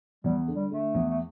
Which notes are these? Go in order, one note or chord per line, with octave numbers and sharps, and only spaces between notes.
E2 G3
D3
G3
D3 A3
E2
A3